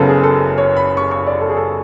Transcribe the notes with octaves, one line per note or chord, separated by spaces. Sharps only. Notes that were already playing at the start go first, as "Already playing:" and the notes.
Already playing: F#1 F#2 C#3 F#3 B3 A4 B4
G#4
A4
C#5
B5
C#6
C#6
D5
A4
G#4
A4